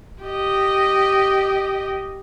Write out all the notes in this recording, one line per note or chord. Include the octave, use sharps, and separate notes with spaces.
G4 D#5